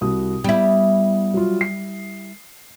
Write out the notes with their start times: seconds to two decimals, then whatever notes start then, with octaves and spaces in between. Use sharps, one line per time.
0.01 C2 F#4 D#6
0.44 G3 B3 E4
1.34 F#3 F4
1.61 C7